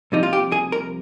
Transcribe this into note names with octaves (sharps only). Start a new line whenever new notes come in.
C2 C3 F3 D#4
F4
G4
G#4
A#4